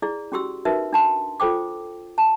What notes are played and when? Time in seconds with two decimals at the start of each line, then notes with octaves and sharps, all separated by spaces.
0.02 E4 G#4 D5
0.32 C#4 F#4 G4 C6 E6
0.65 D#4 F#4 A#4 B4 E5
0.93 D4 A5 C6
1.40 F4 A4 C5 G5 D6
2.18 A5